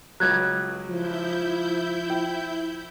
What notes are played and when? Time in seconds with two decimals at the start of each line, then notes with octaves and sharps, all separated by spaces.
0.20 C#2 F#3 F#6 G#6
0.89 F3 E4 G6
2.10 G5